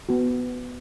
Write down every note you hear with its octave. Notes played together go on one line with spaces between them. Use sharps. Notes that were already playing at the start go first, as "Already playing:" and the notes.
B3 F#4